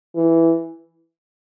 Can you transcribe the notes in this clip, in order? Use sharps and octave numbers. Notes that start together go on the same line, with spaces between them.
E3